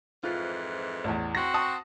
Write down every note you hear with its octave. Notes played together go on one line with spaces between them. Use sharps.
F2 G#2 E3 F4
A1 E2
C4 F#4 A#6
A5 C#6 D#6